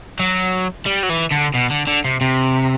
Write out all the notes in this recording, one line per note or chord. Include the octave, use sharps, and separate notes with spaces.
F#3
G3
F#3
E3
D3
B2
D3
D3
C3
C3